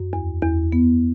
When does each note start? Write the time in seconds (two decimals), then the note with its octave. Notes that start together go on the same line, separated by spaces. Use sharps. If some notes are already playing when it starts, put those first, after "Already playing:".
Already playing: F#2
0.13 E2
0.42 E2
0.72 B3